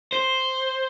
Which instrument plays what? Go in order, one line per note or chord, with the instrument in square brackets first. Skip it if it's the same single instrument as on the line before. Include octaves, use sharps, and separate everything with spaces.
[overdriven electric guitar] C5